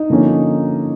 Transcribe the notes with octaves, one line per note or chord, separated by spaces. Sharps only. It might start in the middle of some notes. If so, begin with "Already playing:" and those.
Already playing: D#4
D3 F3 A#3 C#4